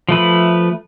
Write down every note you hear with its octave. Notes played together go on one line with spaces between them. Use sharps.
F3 A3 B4